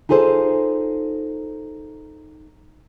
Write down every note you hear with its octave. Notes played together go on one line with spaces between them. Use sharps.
D#4 F4 G#4 A4 C5